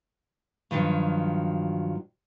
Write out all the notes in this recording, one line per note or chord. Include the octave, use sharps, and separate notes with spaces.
G2 D#3 F3 F#3